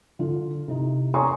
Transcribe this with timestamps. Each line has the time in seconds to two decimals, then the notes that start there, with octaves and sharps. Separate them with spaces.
0.19 D3 F4
0.68 C3 D#4 E4
1.14 C#5 G#5 A#5 C6 C#6 D#6